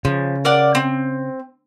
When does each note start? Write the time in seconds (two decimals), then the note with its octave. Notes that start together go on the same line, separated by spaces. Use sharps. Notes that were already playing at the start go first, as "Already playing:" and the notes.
0.05 C#3 F3
0.45 A#4 D5 F#5
0.75 C4